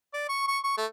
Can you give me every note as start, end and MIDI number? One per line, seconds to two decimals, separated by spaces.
0.14 0.28 74
0.29 0.44 85
0.48 0.58 85
0.64 0.73 85
0.78 0.86 57